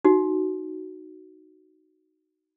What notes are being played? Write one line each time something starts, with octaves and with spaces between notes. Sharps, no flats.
D#4 F#4